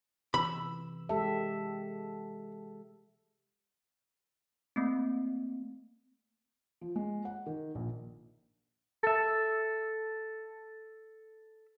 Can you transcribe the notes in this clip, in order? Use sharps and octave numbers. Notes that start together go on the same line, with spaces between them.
C3 E3 B5 E6
G#3 G4 A4 E5
A3 A#3 C4
F3
G#3
F#5
D#3
A#1
A4 E5